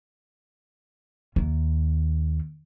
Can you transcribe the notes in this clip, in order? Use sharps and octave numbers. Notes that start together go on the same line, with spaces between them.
D#2